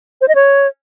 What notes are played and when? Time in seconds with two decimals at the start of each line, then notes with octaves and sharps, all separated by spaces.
0.21 C5
0.28 D#5
0.35 C#5